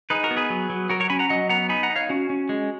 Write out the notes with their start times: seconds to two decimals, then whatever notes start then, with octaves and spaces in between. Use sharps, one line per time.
0.10 D#4 G#4 B4
0.23 F#4 A#4
0.31 B3
0.37 G#4 B4
0.50 F#3
0.70 F#3
0.89 F#3 F#4 A#4
1.00 A#4 C#5
1.10 C#4 G#5 B5
1.19 F#5 A#5
1.29 F#3 D#5 F#5
1.49 B3 F#5 A#5
1.69 D#4 G#5 B5
1.83 F#5 A#5
1.90 D#4
1.96 C#5 F5
2.09 C#4 F#4
2.30 C#4
2.49 G#3